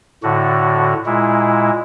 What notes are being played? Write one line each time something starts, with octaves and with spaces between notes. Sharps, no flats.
A2 D3 F#4
A#2 G#3 E4